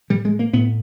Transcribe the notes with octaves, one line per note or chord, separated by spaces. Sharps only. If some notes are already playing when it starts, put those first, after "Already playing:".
A2 G3
G#3
A#3
A2 B3